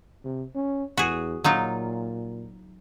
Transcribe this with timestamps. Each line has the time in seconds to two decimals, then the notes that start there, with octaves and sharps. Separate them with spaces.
0.25 C3
0.55 C#4
0.97 E2 F#4 G#4
1.44 A#2 F#3 D#4 F4